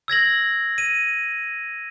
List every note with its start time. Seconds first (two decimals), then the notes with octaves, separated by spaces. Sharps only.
0.08 E6 G#6 A#6 F#7
0.78 D#7